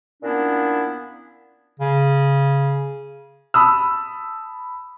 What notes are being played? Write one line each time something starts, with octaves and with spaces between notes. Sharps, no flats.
A#2 A#3 B3 C#4 D4 E4
C#3
A5 B5 D#6 E6